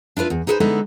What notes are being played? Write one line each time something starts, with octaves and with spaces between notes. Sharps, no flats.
D4 E4 F4 B4
E2
D#4 G#4 A4 B4 C5
D3 G#3 B3 D#4 E4 A4